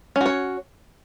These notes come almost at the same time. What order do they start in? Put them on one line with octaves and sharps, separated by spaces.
C#4 F#4 C#5